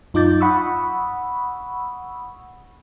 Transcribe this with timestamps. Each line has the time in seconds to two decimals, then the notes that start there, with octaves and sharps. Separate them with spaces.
0.14 F#2 D#4 F4 D6 G6 A6
0.40 F#5 B5 C#6 D#6 E6